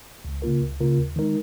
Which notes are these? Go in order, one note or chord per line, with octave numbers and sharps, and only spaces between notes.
C#2
C#3 A#3 F4 A#4
C#2
C#3 A#3 F4 A#4
D#2
D#3 G#3 D#4 A#4